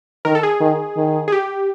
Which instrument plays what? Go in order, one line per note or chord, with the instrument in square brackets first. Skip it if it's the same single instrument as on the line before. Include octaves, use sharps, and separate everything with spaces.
[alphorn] D#3 [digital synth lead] A#4
[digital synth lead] A4
G#4
[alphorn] D#3
D#3
[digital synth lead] G#4
G4